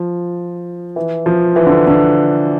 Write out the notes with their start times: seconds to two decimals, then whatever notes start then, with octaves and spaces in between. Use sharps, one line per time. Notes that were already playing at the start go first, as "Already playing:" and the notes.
Already playing: F3
0.96 E3
1.26 F3
1.56 E3
1.66 D3
1.87 D3